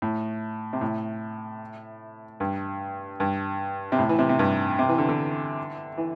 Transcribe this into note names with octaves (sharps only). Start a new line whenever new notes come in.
A2
C3
A2
G2
G2
C3
A2
E3
C3
C3
G2
C3
E3
D3
D3
E3